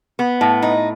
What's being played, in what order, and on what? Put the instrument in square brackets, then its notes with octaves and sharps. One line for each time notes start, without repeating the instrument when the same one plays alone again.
[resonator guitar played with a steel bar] B3
A2
D#4